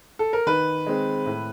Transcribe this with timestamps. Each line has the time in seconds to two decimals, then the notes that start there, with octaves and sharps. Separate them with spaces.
0.19 A4
0.33 A#4
0.47 D#3 B4
0.87 G#3 C4
1.26 A2